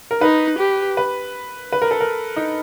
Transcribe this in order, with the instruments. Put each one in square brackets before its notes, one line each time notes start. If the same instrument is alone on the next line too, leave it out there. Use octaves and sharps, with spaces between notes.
[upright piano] A#4
[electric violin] D#4 [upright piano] B4
[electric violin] G4
[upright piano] B4
B4
A#4
A4
A#4
D#4